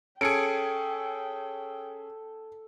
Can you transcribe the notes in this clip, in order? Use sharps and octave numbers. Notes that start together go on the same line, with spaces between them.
C#4 G#4 A4 G5 G#6 C#7 D7